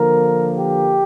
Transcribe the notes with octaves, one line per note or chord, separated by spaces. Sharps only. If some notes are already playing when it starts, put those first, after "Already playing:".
Already playing: D3 F3 A#3 A#4
G4